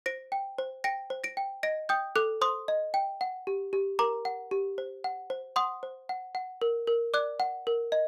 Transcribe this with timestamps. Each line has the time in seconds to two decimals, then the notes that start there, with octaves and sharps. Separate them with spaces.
0.06 C5 A#6 D7
0.32 G5
0.58 C5
0.84 G5 A#6 D7
1.10 C5
1.24 A#6 D7
1.37 G5
1.63 D#5 A#6 D7
1.89 G5 D#6 G6
2.16 A4 D6 F#6
2.41 C5 C6 D#6
2.68 D#5
2.94 G5
3.21 F#5
3.47 G4
3.73 G4
3.99 A#4 A#5 D6
4.25 F#5
4.51 G4
4.78 C5
5.04 F#5
5.30 C5
5.56 F#5 C6 D#6
5.83 C5
6.09 F#5
6.35 F#5
6.62 A#4
6.87 A#4
7.14 D5 D6 F#6
7.40 F#5
7.67 A#4
7.92 D#5